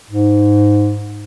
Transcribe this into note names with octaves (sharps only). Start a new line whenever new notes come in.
G#2